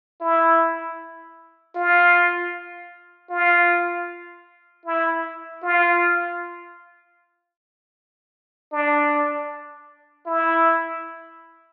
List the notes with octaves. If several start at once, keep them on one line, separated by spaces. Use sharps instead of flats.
E4
F4
F4
E4
F4
D4
E4